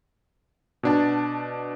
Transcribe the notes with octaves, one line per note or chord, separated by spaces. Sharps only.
B2 D4 A5